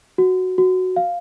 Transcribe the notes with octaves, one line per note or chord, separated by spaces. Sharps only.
F#4
F#4
F5